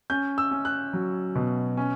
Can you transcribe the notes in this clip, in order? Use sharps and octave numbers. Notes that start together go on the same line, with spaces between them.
C#4 G6
E6
C#4
F#6
F#3
B2
C#4